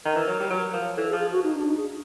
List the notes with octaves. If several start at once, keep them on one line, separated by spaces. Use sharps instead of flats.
D#3 A#4
E3
F#3
G3
F#3
F3
E3 A4
G#4
F3
G#4
F#4
D#4
D4
D#4
G#4